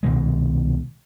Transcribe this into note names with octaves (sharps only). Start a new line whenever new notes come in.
C2 B2 D#3 G#3